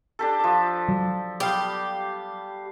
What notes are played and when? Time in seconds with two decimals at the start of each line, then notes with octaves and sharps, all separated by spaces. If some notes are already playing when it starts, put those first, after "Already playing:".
0.19 D4 G4 A4
0.40 F3 D6
0.89 F#3
1.40 G3 B3 G4 F5